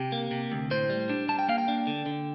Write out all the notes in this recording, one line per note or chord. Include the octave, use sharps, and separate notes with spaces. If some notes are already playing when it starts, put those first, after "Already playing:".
Already playing: C3 G4
A#3
C3
D2
A2 C5
G3
D4
G3 A5
G5
A#3 F5
G5
D4
D3
D3